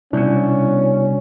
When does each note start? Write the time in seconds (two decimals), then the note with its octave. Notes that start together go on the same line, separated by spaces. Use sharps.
0.13 C2 B2 C#4 D4 E4 C#5